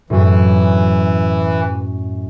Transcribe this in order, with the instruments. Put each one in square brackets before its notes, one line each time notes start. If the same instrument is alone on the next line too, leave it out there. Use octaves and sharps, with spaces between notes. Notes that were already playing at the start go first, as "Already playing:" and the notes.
[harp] F#2 A2 [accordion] E3